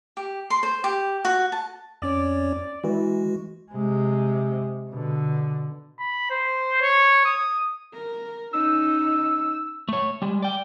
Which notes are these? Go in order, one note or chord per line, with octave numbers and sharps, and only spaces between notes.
G4
C6
C5
G4
F#4
A5
F2 C#4 C#5 D5
E3 G#3 F#4
C3 G#3
B2 D3
B5
C5
C#5
D#6
A#4
C#4 D#4 E6
A3 C#5
G3 G#3
D5 G5